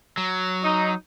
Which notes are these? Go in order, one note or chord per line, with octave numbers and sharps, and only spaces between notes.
F#3
D#4